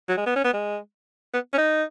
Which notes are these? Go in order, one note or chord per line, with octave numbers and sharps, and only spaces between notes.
F#3
G#3
B3
C#4
B3
G#3
B3
C#4
D#4